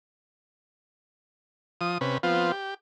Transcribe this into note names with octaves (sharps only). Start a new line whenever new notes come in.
F3 D#6
C3 C#4 B4
F3 B3 C4 F4
G4